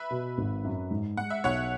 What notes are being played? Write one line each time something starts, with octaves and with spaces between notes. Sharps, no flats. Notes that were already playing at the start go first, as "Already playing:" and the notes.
Already playing: B4 E5
B2
G#1
F#2
G#2
G#3 F#5
E5
B1 C#5 F#5